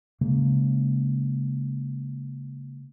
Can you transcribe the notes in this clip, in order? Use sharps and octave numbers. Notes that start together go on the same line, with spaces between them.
C#3 G#3 A#3